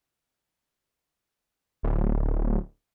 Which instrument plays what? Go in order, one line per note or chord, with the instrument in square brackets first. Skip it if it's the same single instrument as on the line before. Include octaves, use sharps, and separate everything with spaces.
[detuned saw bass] D1